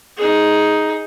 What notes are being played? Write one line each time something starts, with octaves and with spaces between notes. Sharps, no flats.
D#4 G#4